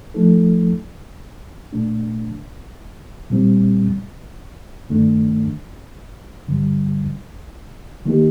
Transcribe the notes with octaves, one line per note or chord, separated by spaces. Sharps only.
F3 A3 D#4 A4
A#2 A3 D4
A#2 G3 C4
G2 D#3 A3 D4
G2 D3 G3
D#3 A#3 D#4 G4